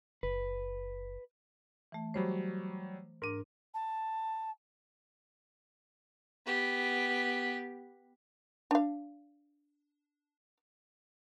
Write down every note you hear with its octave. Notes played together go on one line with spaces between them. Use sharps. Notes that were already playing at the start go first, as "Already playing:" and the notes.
F#1 B4
E3 A3
F#3 G3 C5 C#5 B5
G#2 D4 A#4 D6 D#7
A5
B3 G4
D4 F5